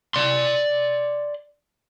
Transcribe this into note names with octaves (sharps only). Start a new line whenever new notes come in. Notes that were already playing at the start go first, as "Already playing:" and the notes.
D5 C6